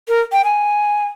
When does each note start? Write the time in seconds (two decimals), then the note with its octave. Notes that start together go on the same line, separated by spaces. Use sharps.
0.08 A#4
0.32 G5
0.44 G#5